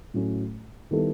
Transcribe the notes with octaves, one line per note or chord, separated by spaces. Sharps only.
A2 F#3 A3 C#4
D#3 G3 B3 E4 A4